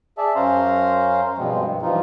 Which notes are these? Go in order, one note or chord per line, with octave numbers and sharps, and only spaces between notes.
G#4 D5 E5 A5
F#2 C#4 C5 F5 A#5 C6
G2 B2 F3 G#3 B3 C4
G2 E3 F3 D#4 F4